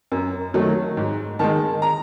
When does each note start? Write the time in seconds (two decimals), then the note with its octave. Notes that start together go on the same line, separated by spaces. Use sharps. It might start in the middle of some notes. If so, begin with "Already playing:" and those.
0.12 F#2
0.54 D#3 F#3 A3
0.97 G#2
1.39 D#3 G#3 A5
1.82 A#5